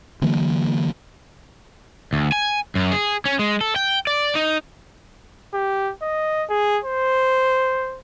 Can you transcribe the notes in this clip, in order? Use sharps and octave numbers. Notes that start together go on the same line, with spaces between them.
D3 E3 F#3 A#3
D2
G#5
F#2
G#4
C#4
G#3
A4
G5
D5
D#4
G4
D#5
G#4
C5